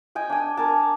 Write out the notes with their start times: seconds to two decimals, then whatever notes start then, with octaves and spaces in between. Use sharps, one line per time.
0.15 D#5 G5 G#5
0.30 D4 G#5
0.57 A#4 G#5 A5